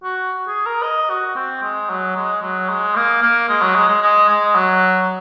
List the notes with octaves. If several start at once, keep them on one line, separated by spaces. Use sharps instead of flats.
F#4
G#4
A#4
D#5
F#4
C4
G#3
F#3
G#3
F#3
G#3
A#3
A#3
G#3
F#3
G#3
G#3
G#3
G#3
F#3